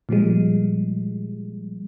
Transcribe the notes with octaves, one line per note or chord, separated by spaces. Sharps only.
A#2 F3 G3 G#3